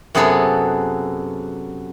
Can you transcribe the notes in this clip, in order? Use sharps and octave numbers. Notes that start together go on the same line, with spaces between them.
F#2 C3 B3 G#4 A4 B4